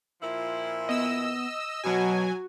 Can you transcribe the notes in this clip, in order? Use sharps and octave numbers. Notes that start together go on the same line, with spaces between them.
A#2 F3 E4
B3 D#5 E6
B2 F#3 F#4 G#5